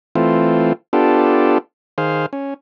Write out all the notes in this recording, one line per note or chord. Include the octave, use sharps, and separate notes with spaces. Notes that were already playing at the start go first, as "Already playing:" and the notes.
E3 A3 C4 F4
B3 D4 F4 G4 A4
D#3 G#4 C5 F5
C#4